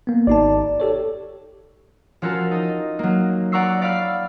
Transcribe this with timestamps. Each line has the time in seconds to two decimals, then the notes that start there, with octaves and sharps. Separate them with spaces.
0.07 A#3 B3
0.27 G#1 D#4 D5 A5
0.80 G4 A4 C#5
2.22 F3 C#4 F4 F#4 A4 A#4
2.51 D#4 D#5
2.99 F#3 A#3
3.52 D5 F#5 A#5 C#6 E6 C7
3.82 D5 F5 B5 E6 F6